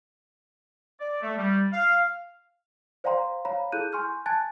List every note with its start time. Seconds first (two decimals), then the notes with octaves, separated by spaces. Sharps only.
1.00 D5
1.22 A3
1.38 G3
1.73 F5
3.04 C5 D5 F5 G5 A#5 C6
3.45 C#5 F5 A#5 B5
3.72 E4 G#4 A4 F#6 G6 D#7
3.92 G#5 C6 C#6 F6 G6
4.26 G#5 A5 F#6 G#6 A6